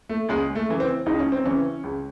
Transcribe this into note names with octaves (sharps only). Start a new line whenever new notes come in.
A3
C#2 G#3
A3
C#3 E3
C4
C#2 D#4
C#4
C4
C#3 E3 C#4
C#2